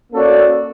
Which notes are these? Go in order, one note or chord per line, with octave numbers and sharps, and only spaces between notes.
A#3 C#4 F#4 A4 D5